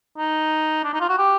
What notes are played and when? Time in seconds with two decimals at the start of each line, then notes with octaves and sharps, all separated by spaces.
0.18 D#4
0.84 D4
0.94 D#4
1.01 F4
1.09 F#4
1.18 G4